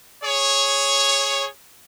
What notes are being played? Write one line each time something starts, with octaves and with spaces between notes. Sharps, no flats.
G#4 C#5